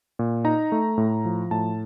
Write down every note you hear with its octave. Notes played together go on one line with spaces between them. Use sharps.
A#2
D#4 A#5
A3
A2
F3
A2 A5